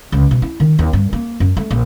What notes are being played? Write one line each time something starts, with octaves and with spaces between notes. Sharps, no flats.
C#2
B2
E4
D#3
D#2
G2
A#3
F#2
A3
A#1